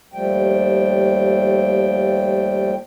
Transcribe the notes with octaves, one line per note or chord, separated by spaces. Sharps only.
D#2 F3 G3 A3 G5